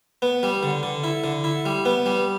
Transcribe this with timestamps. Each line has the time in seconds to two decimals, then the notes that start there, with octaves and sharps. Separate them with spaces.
0.22 B3
0.43 G3
0.63 D3
0.83 D3
1.04 E4
1.24 D3
1.44 E4
1.66 G3
1.85 B3
2.06 G3